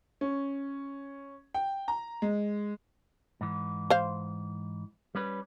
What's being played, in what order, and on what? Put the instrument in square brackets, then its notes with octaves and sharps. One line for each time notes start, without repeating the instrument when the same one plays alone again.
[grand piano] C#4
G5
A#5
G#3
[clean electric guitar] G#2 E3
[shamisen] C5 F5
[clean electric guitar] G3 C#4 B4